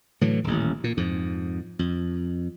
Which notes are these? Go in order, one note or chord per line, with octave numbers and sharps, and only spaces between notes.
A2 D3 E3 F#3
D#1 A1
A#2
F2 G#2
F2